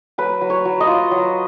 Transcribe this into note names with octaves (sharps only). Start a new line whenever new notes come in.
F#3 B4
F#3
C#5
F#3
D#5
F4
F#3